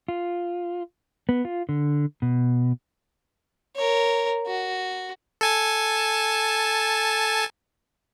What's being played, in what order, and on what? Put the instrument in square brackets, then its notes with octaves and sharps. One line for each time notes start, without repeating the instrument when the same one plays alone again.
[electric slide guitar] F4
B3
F4
D3
B2
[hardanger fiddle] A#4 C#5
F#4
[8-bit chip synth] A4 G#5 A5